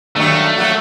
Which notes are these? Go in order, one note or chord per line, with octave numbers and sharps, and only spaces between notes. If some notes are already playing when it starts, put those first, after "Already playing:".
G2 D#3 F#3 A3
F#3 A#3 F#4